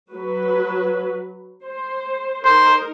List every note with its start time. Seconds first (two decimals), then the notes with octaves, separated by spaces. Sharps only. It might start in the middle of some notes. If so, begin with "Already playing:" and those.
0.10 F#3 F#4 B4
1.63 C5
2.44 D#4 A#4 C5